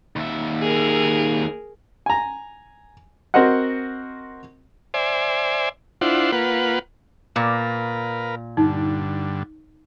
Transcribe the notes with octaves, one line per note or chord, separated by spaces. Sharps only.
D#2 E5
G#4 A#4
G#5 A#5
C4 F#4 A#4 C5 D#5 F#5
C5 D5 E5 G#5
D4 E4 F4 C5 F#5
A#3 F4 B4 F#5
A#2 A#4 B4 F5
G2 D3 D#4